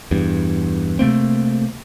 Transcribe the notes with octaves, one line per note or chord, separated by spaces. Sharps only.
E2 G2
C3 A3 A#3 C4